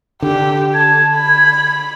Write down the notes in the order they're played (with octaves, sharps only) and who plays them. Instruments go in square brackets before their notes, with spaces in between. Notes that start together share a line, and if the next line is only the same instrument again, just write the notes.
[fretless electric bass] D3 [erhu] G4
[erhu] A5 [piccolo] G#6
[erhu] B5